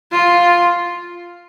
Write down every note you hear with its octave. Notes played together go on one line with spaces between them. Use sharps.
F4